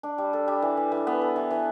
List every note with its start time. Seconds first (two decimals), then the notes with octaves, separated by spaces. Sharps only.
0.03 D4
0.18 G3
0.33 A4
0.48 G3
0.62 E3
0.77 E3
0.92 E3
1.07 B3
1.22 A4
1.36 E3
1.51 E3